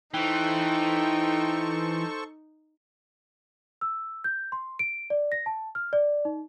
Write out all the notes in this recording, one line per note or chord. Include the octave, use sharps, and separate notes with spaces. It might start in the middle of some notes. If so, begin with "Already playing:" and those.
E3 D#4 A4 C5 G5 C#6
E6
G6
C6
D7
D5
A#6
A5
F6
D5
D#4